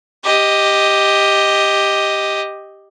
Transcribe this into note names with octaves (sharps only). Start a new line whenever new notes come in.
G4 D#5